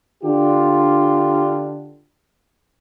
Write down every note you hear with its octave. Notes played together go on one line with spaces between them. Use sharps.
D3 D4 F4 G4